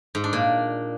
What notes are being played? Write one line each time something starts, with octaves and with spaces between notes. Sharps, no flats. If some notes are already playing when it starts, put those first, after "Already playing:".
G#2
D4
A#2